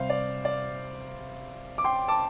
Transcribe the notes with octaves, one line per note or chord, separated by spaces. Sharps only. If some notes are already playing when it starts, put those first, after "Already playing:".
Already playing: C3 G3 C5 F5
D5
D5
D6
G5 C6
A5 D6